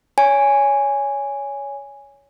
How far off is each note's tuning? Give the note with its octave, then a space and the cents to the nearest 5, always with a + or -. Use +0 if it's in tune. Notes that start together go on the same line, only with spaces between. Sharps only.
C#5 +20 G#5 -5